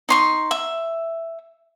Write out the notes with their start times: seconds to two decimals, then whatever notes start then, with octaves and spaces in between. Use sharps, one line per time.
0.09 D#4 C6 C#6
0.51 E5